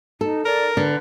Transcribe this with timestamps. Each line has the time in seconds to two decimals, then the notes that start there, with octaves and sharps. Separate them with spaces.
0.21 D#4 A4
0.45 A#4 D5
0.77 D3 B4